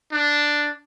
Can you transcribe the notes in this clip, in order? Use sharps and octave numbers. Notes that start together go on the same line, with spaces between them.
D4